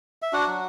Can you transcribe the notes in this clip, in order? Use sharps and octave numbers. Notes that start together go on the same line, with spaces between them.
E5
D4 F#4 F#5
F#3